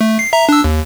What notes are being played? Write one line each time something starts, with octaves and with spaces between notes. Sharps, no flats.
A3
C7
E5 A#5
D4 E6
D#2